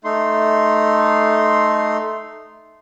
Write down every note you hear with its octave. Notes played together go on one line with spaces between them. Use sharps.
A3 D#4 C6